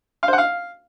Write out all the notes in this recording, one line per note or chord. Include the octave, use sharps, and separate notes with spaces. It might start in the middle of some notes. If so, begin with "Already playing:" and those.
F5
C5
F#5
F5